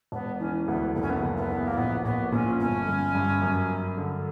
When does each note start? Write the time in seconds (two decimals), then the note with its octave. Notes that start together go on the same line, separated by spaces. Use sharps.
0.12 E1 B3
0.40 E3 C#4
0.67 D2 B3
0.95 F#1 B3
1.02 C#4
1.10 B3
1.23 F#1
1.37 B3
1.50 E2
1.67 A#3
1.77 A#1 B3
2.05 A#1 B3
2.32 A#2 C#4
2.59 G1 C#4
2.87 G1
3.15 G2
3.42 F#2
3.69 F#2
3.97 D3